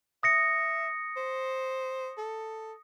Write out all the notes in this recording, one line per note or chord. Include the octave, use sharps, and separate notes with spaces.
E5 D#6 A#6 C#7
C5
A4